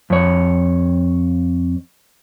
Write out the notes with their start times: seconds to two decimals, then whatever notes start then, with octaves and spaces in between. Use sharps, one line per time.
0.10 F2 C#5